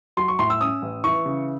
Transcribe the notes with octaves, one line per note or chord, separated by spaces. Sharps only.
F#3 C6
C#6
A2 C6
E6
C#4 D#6
A1
E3 C#6
C#3